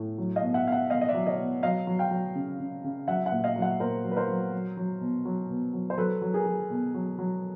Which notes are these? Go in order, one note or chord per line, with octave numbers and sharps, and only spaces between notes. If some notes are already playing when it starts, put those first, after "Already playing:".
Already playing: A2
F#3
D#5 F5
B2
E5 F#5
B2 F5
E5 F#5
B2 D#5 F5
D#5
D5 E5
F#3
C#5 D#5
B2
F#3 D#5 F5
F#3
F5 G5
F#3
C#3
C#3
C#3
F#3 E5 F#5
E5 F#5
A#2
D#5 F5
F#3
E5 F#5
A#2 A#4 C5
F#3
B4
A#4 C5
F#3
F#3
F#3
B2
F#3
B2
F#3
C5
F#3 A4 B4
F#3
G#4 A#4
F#3
B2
F#3
F#3